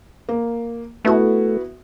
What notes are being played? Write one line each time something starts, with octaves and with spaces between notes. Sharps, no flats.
A#3
A3 B3 E4 F#4